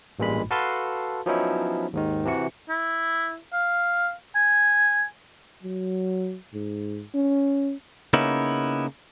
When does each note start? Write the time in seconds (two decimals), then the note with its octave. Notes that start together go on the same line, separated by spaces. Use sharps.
0.19 A1 G2 A#2 G#3 B5
0.51 F#4 A4 B4 F5 A5 C6
1.26 F3 F#3 B3 C#4 D#4 E4
1.93 D#2 G#2 D#3
2.25 C3 E3 F#4 C#7
2.69 E4
3.53 F5
4.35 G#5
5.63 F#3
6.54 G#2
7.15 C#4
8.13 C#3 A#3 B3 C#4 D#4 E4